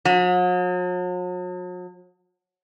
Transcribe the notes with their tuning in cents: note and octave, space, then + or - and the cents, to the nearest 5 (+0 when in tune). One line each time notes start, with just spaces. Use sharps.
F#3 -45